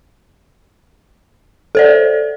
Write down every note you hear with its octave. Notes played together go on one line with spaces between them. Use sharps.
A4 C5 D5